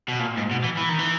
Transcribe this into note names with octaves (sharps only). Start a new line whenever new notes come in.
B2
A#2
G#2
B2
E3
E3
D#3
E3